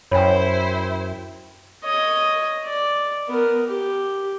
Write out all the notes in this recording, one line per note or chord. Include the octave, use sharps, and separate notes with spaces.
F#2 E4 C5 C#5 G5 G#5 B5
C#5 D#5
D5
B3 A#4
G4